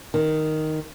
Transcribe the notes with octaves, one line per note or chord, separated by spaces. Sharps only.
D#3